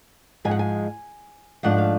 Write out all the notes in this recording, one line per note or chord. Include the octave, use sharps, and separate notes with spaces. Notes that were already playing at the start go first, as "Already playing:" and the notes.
G#2 F3 G#3 G#5
F#5
G#5
G#2 F3 A3 D4 F#5
F5